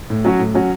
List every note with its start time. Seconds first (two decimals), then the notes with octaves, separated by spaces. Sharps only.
0.10 A2
0.25 F#3 C#4 F#4
0.39 A2
0.55 F#3 C#4 F#4